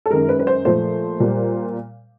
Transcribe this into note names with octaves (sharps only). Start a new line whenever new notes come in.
A4
F#2 D#3 G#3 A#4
B4
B4
C5
A#2 F3 A3 C5
A#2 G3